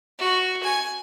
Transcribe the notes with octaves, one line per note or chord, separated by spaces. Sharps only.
F#4
G#5